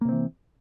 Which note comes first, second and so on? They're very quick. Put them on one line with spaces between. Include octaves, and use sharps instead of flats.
A#3 C3 C4 E3